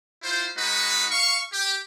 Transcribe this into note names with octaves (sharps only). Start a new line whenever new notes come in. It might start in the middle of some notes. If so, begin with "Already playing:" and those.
E4 F4 C5
G#3 D#4 F#4 B4
F5 C#6
G4